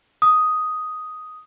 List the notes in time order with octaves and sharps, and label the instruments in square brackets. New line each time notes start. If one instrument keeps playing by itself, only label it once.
[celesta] D#6